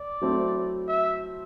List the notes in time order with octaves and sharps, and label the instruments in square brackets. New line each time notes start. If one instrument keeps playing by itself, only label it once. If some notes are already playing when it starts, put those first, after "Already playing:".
Already playing: [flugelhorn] D5
[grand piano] F#3 A3 C4 E4
[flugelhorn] E5